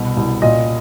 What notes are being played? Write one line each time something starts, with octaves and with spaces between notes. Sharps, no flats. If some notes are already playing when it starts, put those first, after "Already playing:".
Already playing: C2 B2
C2
A#2 D#5